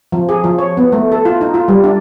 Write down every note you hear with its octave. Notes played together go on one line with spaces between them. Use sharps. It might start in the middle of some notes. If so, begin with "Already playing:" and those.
F3
G#4
F3
C#5
B3
A3
A4
F4
D#4
F4
G3
D4